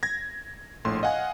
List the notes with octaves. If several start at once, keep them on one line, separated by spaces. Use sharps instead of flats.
G#6 A#6
A#1 A2 C6
D#5 F5 F#5 G#5